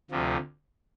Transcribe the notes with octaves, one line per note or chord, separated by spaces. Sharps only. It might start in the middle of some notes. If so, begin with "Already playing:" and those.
D2 C3 F3